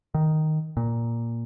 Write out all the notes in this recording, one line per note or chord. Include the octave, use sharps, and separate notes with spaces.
D#3
A#2